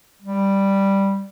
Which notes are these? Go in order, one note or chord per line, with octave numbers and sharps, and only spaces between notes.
G3